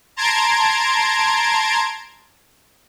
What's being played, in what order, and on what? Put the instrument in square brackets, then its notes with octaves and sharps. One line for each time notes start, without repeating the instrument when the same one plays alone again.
[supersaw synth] A5 A#5 C6 G#6 D7